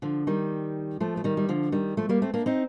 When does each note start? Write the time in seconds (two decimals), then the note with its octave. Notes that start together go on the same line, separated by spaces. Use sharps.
0.02 D3 F3
0.27 D#3 G3
1.00 F3 A3
1.17 A3
1.24 D#3 G3
1.37 G3
1.49 D3 F3
1.72 D#3 G3
1.97 F3 A3
2.09 G3 A#3
2.22 A3 C4
2.34 A#3 D4
2.46 C4 D#4